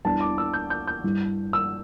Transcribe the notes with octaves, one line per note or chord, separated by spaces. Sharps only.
E2 E3 G3 B3 D4 A5
D6
E6
G6
G6
G6
G2 G3 E4
E6